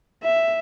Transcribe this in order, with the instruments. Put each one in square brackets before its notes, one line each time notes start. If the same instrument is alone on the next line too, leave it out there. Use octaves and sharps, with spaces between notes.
[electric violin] E5